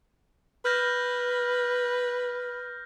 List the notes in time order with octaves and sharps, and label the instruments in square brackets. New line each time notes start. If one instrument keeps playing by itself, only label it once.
[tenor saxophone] B4 [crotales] F6 G6 A#6